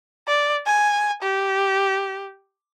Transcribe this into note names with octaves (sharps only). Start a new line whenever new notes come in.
D5
G#5
G4